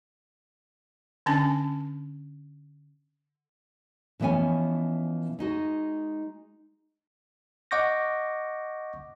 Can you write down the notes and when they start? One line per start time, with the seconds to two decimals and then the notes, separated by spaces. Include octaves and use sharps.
1.26 D3 C#4 D4 G#5 A5
4.20 B2 E3 F3 B3 C#4 G#5
5.39 G#3 D#4 F#4
7.71 D#5 F#5 C#6 D6 G6 A#6